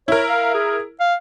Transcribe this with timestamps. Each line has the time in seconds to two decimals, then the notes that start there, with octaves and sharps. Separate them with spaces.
0.08 E4 A#4 C#5
0.29 F5
0.54 G#4
1.00 F5